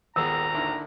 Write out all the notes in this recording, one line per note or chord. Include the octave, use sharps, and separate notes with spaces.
D#1 G#1 A#3 B3 G#4 A#5 E6
D3 D#3 E4